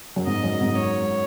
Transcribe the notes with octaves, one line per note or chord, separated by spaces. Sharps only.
F#2
G#2 D#5
F#2
G#2
C#5